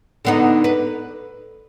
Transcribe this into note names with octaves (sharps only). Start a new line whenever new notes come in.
D3 B3 D#4
B4